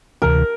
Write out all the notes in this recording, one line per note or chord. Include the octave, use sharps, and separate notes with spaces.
D2 C3 E3 A#4